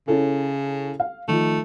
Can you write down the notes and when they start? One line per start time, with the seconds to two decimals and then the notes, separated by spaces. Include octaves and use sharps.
0.08 C#3 C#4 E4 A4
1.00 F5
1.28 D#3 F3 A3